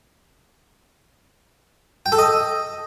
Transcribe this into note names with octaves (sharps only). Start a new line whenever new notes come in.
G5
A4
D#5